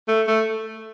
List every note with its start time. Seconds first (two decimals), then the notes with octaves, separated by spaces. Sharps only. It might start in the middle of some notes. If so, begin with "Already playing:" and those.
0.08 A3
0.28 A3